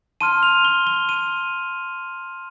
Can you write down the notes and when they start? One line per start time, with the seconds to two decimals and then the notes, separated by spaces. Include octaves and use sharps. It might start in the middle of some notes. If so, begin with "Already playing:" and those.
0.21 A5 C6 F6 D#7
0.43 F7
0.65 G7
0.87 G7
1.09 D#7